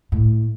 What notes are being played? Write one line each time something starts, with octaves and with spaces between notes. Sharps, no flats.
A2